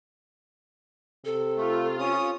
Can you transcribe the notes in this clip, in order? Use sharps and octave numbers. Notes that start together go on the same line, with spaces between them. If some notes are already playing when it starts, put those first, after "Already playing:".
C3 A4
A3 F4
C#4 D#6